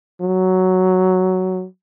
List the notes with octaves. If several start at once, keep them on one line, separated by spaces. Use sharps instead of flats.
F#3